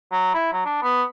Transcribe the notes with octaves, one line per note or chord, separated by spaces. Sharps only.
F#3
E4
F#3
D4
B3